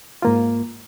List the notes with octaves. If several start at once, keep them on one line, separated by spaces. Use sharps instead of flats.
G#2 A#3 F4